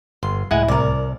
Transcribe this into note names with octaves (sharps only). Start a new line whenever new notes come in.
G1 C6
C#2 A2 G#3 E4 F#5 G#5
C2 A#4 D5